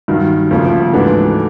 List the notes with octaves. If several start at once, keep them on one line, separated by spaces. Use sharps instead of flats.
G2 D#3 F#3
D2 C#3 F3 A#3
G#2 E3 A3 D4 F#4